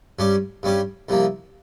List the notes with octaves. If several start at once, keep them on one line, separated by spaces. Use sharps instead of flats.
G2 G3 C#4 G4
G2 G3 C#4 G4
C2 C3 F3 A#3